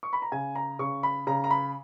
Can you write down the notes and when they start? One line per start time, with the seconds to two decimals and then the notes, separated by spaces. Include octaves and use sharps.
0.03 C#6
0.13 B5
0.22 A#5
0.32 C#3 G#5
0.55 A#5
0.79 C#3 C#6
1.03 B5
1.27 C#3 A#5
1.44 A#5
1.51 B5